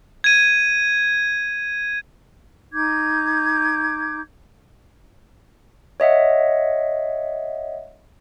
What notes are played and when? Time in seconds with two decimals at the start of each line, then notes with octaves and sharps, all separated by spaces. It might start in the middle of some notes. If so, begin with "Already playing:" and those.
0.24 G#6 D#7
2.72 D#4 D6 G6 G#6
6.00 C#5 D#5 E5 F#5